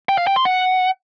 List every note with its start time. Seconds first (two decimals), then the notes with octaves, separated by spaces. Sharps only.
0.09 G5
0.18 F5
0.27 G5
0.36 C6
0.45 F#5